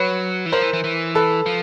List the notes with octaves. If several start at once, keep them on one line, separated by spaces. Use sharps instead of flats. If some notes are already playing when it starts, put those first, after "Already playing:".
Already playing: F#3 B4 C#5
E3
F3 A#4 C5
E3
E3
E3
A4 B4
F3